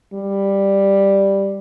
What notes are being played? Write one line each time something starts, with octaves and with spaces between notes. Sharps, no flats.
G3